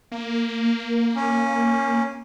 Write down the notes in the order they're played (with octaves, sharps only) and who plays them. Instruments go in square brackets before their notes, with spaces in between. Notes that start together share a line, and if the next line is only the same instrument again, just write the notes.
[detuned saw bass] A#3
[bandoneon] C#4